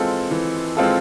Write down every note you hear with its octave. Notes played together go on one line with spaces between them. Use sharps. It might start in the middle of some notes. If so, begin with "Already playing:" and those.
Already playing: E3 G#3 C4 F4 A4
E3
G#3 C4 F4 A4